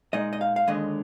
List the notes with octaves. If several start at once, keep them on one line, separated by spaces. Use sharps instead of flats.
A#2 G#3 D#4 D#5
D#5
F5
F5
D#2 D3 G#3 D#5